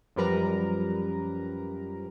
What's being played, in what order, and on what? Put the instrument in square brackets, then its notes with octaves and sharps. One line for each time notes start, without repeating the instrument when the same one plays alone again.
[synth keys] F#2 F3 G3 A#4 B4 A#5